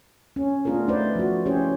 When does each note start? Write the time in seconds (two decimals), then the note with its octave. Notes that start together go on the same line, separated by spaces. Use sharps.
0.36 C#4
0.65 A3 B3 D4 F4 G#4 A#4
0.88 A3 D#4 B4 C5 D5
1.15 F3 F#4
1.46 C#4 E4 G4 G#4 C5 C#5